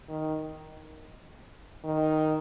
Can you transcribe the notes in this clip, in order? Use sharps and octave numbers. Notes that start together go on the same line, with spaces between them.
D#3
D#3